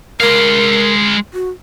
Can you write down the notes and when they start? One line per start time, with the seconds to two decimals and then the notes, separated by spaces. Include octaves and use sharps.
0.21 G#3 A#4 F5
1.34 F#4